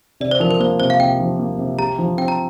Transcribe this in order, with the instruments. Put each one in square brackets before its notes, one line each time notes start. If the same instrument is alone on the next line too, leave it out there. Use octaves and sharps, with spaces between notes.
[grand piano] C3 [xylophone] D5
[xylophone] C5
[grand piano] F3 [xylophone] A#4
[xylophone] A#4
[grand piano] A#3 [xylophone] C5
[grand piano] C3 [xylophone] C5
[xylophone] F5
[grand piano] C3 [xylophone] G5
[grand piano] F3
A#3
C3
[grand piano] G4 [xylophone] A#5
[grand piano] F3
[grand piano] C4 [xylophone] G5
[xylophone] A#5